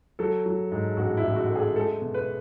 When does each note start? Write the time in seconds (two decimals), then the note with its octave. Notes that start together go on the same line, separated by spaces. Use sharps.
0.19 F#3 A4
0.46 F#3
0.72 G#2
0.97 A1 F#4
1.17 E4
1.24 A1
1.36 F#4
1.50 A3
1.56 G#4
1.76 G#3 A4
2.02 B2
2.14 B4